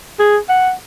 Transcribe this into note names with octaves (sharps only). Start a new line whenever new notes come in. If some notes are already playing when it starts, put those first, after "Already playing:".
G#4
F#5